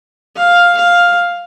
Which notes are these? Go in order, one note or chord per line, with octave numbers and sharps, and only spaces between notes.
F5
F5